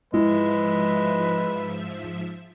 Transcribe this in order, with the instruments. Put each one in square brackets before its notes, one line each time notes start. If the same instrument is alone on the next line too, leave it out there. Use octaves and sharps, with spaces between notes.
[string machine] G#2 F3 E5 [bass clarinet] G#3 [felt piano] E4 [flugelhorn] B4